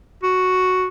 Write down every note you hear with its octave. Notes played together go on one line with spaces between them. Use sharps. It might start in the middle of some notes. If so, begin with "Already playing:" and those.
F#4